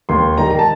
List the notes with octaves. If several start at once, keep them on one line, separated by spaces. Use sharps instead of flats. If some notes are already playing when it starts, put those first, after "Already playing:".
D#2 C6
D#3 G3 A#5
A#5
A5